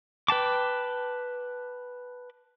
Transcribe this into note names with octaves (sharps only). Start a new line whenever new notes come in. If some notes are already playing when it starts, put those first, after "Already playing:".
B4 G5 A5 D6